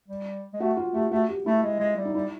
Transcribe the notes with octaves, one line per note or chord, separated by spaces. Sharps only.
G3
G#3
A3 F#4
F4
A3 G4
A3 F#4
G4
A3 E4
G#3
G#3
G3
D#4
G3 E4